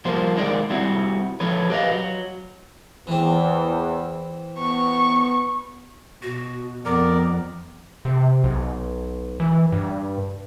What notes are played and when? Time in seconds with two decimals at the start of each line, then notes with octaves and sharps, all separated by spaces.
0.05 F3 G3 A#3 C5
0.36 D#3 G#3 A#3 D4 D5
0.70 G3 C4 E4 F#4
1.40 F3 A3 B4 C#5
1.70 G4 B4 D#5 F5
1.92 F#3
3.07 E2 E3 C4
4.58 B3 C#6
6.22 B2 F#4
6.86 F2 B3 A#4 D5
8.05 C3
8.44 B1
9.40 E3
9.72 G2